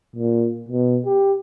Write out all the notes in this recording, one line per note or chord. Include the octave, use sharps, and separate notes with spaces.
A#2
B2
G4